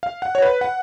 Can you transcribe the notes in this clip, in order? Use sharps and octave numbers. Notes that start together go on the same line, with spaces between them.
F5
F#5
C#5
B4
F#5